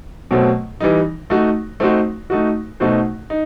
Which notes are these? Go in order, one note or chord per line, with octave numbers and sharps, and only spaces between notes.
B2 F#3 A3 C4
E3 G3 D#4
A3 D#4 F#4
A3 C4 D#4 F#4 C5
A3 D#4 F#4
B2 A3 D#4 F#4 C5
D#4